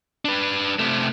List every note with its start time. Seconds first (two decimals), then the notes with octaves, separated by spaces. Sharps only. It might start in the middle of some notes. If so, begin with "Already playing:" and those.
0.25 D4 B4
0.79 C3 A3